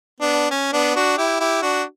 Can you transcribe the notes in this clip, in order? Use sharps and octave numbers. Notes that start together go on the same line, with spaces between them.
B3 D4
C#4
B3 D4
D4 F#4
E4 G4
E4 G4
D4 F#4